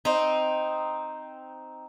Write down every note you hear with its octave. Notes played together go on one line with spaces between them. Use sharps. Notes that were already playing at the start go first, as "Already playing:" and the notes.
C4 D#4